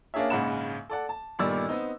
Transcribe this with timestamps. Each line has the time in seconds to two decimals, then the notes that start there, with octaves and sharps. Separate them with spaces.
0.14 A#3 C#4 D4 G#4 C#5 E5
0.30 A#1 G#2 C#3 F#5 B5 E7
0.90 A4 D5 F#5
1.09 A5
1.39 G1 A#2 D#3 G3 D5 E6
1.69 B3 C4 D#4